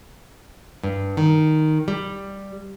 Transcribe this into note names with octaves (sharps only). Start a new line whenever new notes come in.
G2
D#3
G3